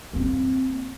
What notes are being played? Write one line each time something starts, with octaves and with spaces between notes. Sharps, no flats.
A#3 C4